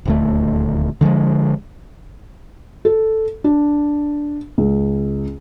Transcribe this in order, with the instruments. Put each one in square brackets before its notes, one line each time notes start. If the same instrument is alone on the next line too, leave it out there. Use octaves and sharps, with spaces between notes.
[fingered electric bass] D#1 D2 A3
D3 F3 G3 G#3
[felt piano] A4
D4
C#2